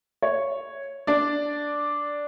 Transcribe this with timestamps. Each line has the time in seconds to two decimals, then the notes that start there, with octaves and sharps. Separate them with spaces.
0.22 C#5
1.07 D4 D5